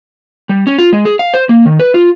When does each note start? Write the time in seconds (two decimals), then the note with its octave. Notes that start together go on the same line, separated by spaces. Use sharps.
0.49 G3
0.67 C#4
0.79 F4
0.93 G#3
1.05 G#4
1.19 F5
1.34 C5
1.49 A#3
1.65 D#3
1.80 B4
1.94 F4